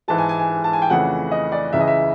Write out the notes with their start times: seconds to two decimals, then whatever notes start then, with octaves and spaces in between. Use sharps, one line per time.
0.08 G#2 E3 G#3 A5
0.18 G#5
0.29 G#5
0.39 G#5
0.64 A5
0.73 G#5
0.82 G5
0.90 F2 C#3 E3 A3 F#5
1.32 D#5
1.52 D5
1.73 C#2 C#3 E3 E5
1.81 D#5
1.88 E5